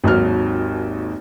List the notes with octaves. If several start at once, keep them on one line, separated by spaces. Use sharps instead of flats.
G#1 D#2 F#3 F6